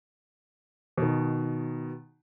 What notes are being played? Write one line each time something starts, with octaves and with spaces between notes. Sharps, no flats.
B2 D#3